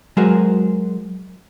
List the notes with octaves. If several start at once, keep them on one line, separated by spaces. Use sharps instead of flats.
F#3 G#3 F#4 G#4 A#4 C5